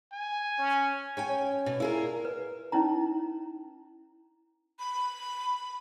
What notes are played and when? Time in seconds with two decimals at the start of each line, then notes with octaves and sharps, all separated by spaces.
0.12 G#5
0.58 C#4
1.17 C#5 G5 G#5
1.29 C#4
1.66 B2
1.80 A#2 E4 G#4 A#4
2.25 B4
2.72 C#4 D#4 E4 A#5
4.79 B5